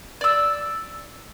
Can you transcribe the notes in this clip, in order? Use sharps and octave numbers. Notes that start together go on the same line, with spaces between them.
D5 E6